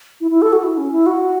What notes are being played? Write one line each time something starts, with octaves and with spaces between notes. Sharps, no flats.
E4
E4
A4
F#4
E4
C#4
E4
F#4